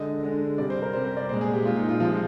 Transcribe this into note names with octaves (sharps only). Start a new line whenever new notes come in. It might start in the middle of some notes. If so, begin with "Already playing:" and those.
Already playing: D3 G#3 D#5
D3 G#3
C3 G3 D5
C5
A#4
C3 G3 C5
C5
D5
A#2 G#3 C5
G#4
G4
A#2 G#3 F4
D#4
F4
C3 F3 G#3 F4